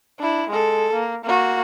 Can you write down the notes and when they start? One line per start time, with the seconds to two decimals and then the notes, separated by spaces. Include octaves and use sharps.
0.19 D4 E4
0.49 G#3 A4
0.93 A#3
1.25 A#3 F#4